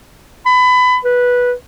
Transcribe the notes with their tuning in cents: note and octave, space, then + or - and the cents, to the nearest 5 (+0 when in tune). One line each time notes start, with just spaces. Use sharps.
B5 +25
B4 -10